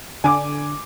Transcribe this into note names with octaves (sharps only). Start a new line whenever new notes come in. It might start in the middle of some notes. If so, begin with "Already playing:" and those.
D3 G#5 D6